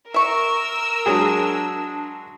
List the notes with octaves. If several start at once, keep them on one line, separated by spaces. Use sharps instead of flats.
A#4 E5 C#6 E6
F#3 G#3 D4 G#4